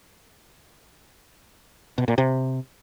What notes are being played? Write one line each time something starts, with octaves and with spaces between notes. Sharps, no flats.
B2
A#2
C3